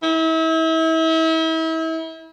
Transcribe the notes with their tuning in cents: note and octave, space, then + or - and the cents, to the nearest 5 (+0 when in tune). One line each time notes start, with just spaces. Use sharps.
E4 -35